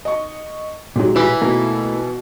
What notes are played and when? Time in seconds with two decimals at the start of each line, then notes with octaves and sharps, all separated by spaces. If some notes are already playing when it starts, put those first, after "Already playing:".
0.05 D#5 C#6
0.96 A#2 F#3 G#3 G4
1.16 E3 E4 B5
1.42 B2 A3 A#3